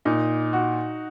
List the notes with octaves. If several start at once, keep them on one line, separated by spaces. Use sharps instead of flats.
A#2 D#4
F#4